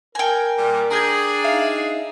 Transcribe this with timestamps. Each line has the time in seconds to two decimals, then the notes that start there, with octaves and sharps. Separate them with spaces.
0.15 A#4 G5 G#5
0.58 A#2 G3
0.91 D4 G#4 A#5 G6 G#6
1.44 D#4 E5 F5 C7